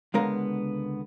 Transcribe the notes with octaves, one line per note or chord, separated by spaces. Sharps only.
C#2 D3 G#3 B3 A#4 F5